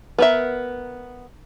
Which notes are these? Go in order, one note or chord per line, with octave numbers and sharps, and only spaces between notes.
B3 A#4 E5